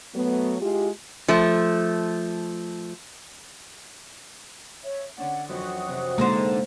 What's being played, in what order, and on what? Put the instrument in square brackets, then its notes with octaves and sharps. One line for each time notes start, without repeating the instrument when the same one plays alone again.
[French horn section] F#3 A3 B3
G#3 E4 F4 G4
[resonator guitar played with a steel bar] F3 A3
[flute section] C#5 E5
[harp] D3 C#4 D4 [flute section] F#5
[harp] F2 E3 F#3 [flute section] F#4 D#6
[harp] C3
[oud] D3 D#4 C5 [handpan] G#3 A#3 [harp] A#4